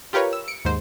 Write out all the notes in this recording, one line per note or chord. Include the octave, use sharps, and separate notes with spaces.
F4 G4 A#4 B4 C#5
E6
C#7 D7
D#2 G#2 C5